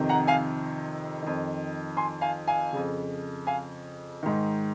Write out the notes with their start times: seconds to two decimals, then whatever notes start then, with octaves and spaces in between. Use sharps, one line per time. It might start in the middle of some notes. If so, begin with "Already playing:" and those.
Already playing: F2 C3 D#3
0.09 F#5 A#5
0.27 F5 G#5
1.22 F2 D#3
1.97 G#5 C6
2.21 F5 G#5
2.48 F5 G#5
2.73 F2 C#3
3.47 F5 G#5
4.23 G#2 D#3